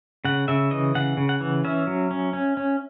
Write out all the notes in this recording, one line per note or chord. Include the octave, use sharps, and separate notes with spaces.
C#3 F#5
C#3 E5
E3 D#5
C#3 F#5
C#3
F#5
E3
C#4 E5
F#3
C#4
C#4
C#4